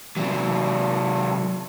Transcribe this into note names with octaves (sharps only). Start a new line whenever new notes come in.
C3 F#3